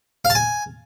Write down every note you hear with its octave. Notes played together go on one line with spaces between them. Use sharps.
F5
A5
G#5